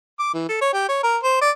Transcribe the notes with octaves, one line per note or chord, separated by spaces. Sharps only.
D6
E3
A4
C#5
G4
C#5
A#4
C5
D5